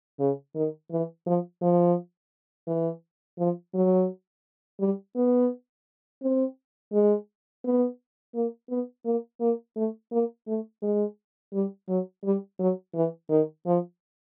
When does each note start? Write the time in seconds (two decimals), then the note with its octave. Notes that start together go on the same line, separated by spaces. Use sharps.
0.20 C#3
0.55 D#3
0.91 E3
1.26 F3
1.62 F3
2.67 E3
3.39 F3
3.74 F#3
4.80 G3
5.16 B3
6.23 C4
6.92 G#3
7.64 B3
8.35 A#3
8.70 B3
9.05 A#3
9.40 A#3
9.76 A3
10.12 A#3
10.47 A3
10.83 G#3
11.53 G3
11.89 F#3
12.24 G3
12.59 F#3
12.95 E3
13.30 D#3
13.66 F3